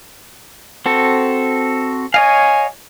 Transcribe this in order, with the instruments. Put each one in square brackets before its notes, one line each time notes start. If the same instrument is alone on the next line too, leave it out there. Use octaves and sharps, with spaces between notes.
[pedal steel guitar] C4 F#4 A4
[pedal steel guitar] C#5 D#5 F5 [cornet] G#5